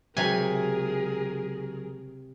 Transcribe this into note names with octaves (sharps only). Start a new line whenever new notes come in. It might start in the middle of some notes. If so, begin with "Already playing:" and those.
C#2 C3 F#3 G#4 A#4 G#5